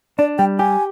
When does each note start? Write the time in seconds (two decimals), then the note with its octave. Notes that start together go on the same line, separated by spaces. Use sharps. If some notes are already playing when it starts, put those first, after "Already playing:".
0.18 D4 D5
0.38 G3 G5
0.59 G4 G#5